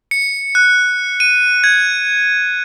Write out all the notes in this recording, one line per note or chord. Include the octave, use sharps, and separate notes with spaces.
C#7
F#6
D#7
G#6